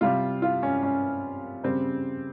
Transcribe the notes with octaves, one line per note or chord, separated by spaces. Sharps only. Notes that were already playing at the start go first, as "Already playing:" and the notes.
C3 G3 F4
F4
C#4
C#4
C#3 G3 C4